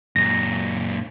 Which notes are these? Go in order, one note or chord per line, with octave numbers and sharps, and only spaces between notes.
F#2 A#2 A#6